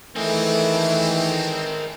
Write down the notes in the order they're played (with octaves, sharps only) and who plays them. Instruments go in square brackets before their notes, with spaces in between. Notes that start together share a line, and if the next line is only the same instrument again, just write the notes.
[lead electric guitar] D#3 G#4 [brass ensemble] E3 [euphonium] A3 [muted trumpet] C4